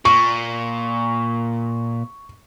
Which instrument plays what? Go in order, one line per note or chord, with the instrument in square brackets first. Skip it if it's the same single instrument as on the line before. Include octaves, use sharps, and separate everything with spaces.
[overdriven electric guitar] A#2 [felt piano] C#6